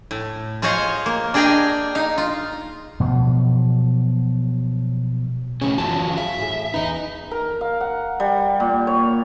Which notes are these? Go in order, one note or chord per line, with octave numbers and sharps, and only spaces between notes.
A2
F4 G#4 C5 C#5 D#5 F5
A#3
D4 G#4 D#5 G5 G#5 A#5
D#4 F5
F4
B2 F3 F#3
F2 A2 C#3 C#4 G#4 C#5
F#2 E3 F3 F#4 A5
G#4 E5 F5
A2 G#4
E2 E3 D#4 B4 D#5
A#4
F5
F#5
G3
A#2
C#5